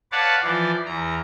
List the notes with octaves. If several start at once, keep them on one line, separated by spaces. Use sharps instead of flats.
B4 C#5 D5 F5 F#5 A5
E3 F3 D5
E2 A#5